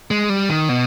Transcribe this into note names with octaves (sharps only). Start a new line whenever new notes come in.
G#3
G3
D#3
B2